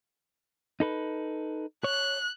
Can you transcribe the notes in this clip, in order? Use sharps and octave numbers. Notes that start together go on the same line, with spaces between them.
D#4 A4 B4
C#5 F#6